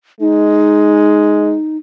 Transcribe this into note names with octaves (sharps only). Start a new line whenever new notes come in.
G#3 D#4